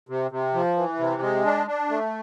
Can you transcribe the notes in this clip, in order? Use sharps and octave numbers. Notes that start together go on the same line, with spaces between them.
C3
C3
F3
E3
C3
G#3
D4
D4
A3